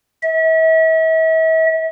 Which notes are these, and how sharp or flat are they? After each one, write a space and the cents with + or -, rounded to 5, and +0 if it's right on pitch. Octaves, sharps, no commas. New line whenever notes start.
E5 -40